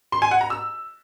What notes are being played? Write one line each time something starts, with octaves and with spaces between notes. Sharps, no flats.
C6
G#5
F#5
A#5
E6